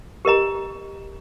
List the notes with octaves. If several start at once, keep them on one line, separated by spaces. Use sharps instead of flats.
G4 A#4 D#5 A#5